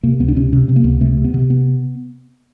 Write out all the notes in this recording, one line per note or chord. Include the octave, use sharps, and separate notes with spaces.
C3 A#3
C#2 B3
D4
C3 C#4
C3 C#4
C3 C4
A#3
C#2 B3
C3 A3
C3
B3
C3
B3